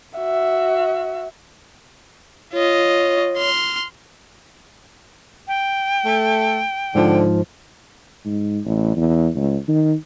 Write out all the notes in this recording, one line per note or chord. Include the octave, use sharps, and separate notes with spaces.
F#4 E5
F4 C#5 D#5
C6 F6
G5
A3
G#2 D3 F3
G#2
A1
E2
C#2
D#3